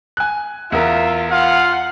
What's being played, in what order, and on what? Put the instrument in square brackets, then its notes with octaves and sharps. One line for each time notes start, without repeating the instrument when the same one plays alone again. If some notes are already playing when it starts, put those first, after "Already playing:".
[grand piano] G#5 F#6
[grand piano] E2 A#4 [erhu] F4 [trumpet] E5
[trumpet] F4 [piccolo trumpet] F5 [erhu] F#5